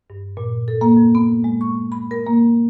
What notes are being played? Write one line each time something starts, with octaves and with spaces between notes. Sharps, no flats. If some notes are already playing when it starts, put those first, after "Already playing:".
G2
A#2
A4
A#3
F2
B3
G#3
C#6
B5
A#4
A#3